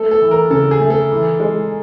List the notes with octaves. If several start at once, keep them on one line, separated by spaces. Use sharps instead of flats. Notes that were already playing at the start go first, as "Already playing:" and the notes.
Already playing: A3 A4
A4
E3
A#4
C#3 A4
G#4
A3
A4
E3
G#3